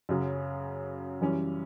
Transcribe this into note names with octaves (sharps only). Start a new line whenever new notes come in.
F#2 C#3 F#3
F#2 E3 G3 C#4